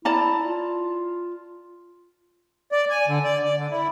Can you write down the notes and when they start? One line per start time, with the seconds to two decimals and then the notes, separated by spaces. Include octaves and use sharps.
0.05 E4 D5 A5 A#5
0.44 F4
2.72 D5
2.89 G#5
3.08 D3
3.24 D5
3.44 D5
3.57 D3
3.70 E4